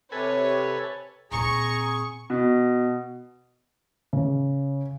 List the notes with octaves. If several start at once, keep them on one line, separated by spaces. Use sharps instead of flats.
C3 A4 B4 C#5 G#5
A#2 C4 G#4 A#5 C#6
B2
C#3